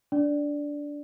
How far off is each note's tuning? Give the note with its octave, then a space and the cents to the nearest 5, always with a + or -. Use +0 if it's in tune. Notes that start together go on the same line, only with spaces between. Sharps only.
D4 -15 D5 +0